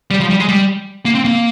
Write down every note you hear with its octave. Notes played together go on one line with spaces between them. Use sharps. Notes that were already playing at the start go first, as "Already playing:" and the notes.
G3
F3
G3
G#3
G3
A#3
C4
A#3